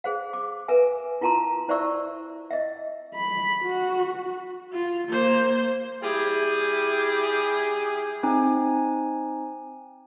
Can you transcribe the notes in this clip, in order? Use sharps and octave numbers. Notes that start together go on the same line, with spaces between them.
G#4 C5 F5
D6
A#4 B4 E5 G#5
E4 F4 A#4 A5 A#5 C6
E4 C5 D5 E5 C#6 E6
D#5 E5
B5
F#4
F4
A#3 C5
G3 E4 G4 G#4
C4 D#4 G#5